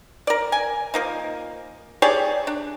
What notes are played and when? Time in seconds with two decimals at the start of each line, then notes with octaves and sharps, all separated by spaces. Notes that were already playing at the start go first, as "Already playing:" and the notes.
0.27 A#4 D5
0.52 G#5
0.94 F3 A#3 D#4
2.02 G4 G#4 C#5 D5
2.47 D4